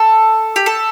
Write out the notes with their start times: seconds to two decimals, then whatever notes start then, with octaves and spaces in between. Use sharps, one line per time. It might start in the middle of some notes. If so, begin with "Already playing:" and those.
Already playing: A4
0.56 G4
0.66 A4